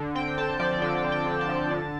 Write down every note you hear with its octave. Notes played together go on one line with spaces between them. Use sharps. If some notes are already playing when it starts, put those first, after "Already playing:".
Already playing: D3
C4 G5
D3 A5
F3 D5
D3 G5
C4
G5
D3
A5
F3
D3